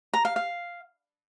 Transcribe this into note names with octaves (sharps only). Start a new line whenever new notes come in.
A#5
F5
F5